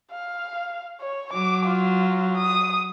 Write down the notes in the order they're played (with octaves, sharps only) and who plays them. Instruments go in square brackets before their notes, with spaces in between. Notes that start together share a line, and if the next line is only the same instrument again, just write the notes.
[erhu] F5
C#5
[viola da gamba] F#3 [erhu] D6
[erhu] F4
D#6